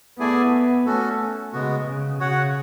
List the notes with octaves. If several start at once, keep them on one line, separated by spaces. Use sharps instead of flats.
A3 B3 E4 G#4 D5 G#5
A3 C#4 F#4 A4
C#3 G#3 B3 F#4
C#3
C#3 F#4 C#5 F#5